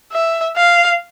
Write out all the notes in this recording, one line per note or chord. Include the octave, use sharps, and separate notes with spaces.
E5
F5